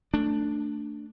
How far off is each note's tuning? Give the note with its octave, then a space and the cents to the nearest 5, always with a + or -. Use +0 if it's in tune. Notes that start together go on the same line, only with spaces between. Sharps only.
A3 +20 D4 +0